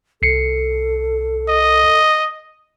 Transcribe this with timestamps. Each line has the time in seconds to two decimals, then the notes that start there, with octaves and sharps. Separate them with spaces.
0.22 C2 A4 C7 C#7
1.49 D#5